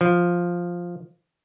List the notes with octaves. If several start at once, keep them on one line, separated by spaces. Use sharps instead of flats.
F3